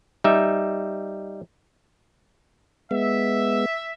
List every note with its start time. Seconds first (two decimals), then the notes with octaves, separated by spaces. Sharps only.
0.24 G3 D#4 E5
2.91 G#3 B3 E5